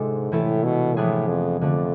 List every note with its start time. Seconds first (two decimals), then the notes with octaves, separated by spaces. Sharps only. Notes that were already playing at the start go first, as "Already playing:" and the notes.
Already playing: G#2 C3 G#3 D4 F4 A4
0.32 A2 C3 E3 A3 E4 A4
0.64 B2
0.96 A2 F3 B3 D4 G#4
1.28 F2
1.61 F2 D3 A3 D4